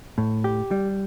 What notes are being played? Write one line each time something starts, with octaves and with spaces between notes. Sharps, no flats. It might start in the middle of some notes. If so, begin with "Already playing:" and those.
A2
G4
G3